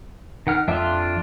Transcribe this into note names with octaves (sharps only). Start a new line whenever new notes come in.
D#3 F#5 F6
F2 D4 F4 E5